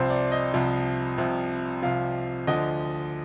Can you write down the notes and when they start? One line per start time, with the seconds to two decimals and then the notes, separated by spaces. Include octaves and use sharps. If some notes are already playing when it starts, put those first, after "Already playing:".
Already playing: C2 C3 F3 C5
0.10 D5
0.32 D#5
0.54 C2 C3 F3
1.18 C2 C3 F3
1.82 C2 C3 F3 F5
2.47 D2 D3 F3 D#5